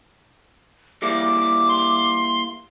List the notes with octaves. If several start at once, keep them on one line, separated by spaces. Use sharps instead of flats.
G3 A#3 E4 D6
C6